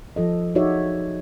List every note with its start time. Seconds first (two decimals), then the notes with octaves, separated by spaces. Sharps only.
0.16 F3 A4 D#5
0.55 D#4 F#4 G#4 C#5 D5 E5